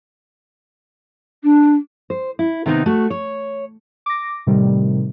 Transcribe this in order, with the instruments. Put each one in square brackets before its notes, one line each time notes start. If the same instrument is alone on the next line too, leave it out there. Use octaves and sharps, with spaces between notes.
[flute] D4
[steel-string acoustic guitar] C5
E4
C3 D#3 B3 C4 D4 D#4
A3 F#4
C#5
[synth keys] D6 A#6
A2 C3 D#3 G3